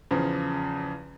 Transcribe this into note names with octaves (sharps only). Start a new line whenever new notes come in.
E2 C#3 F3